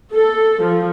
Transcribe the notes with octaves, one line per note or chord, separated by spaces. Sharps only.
A4
F3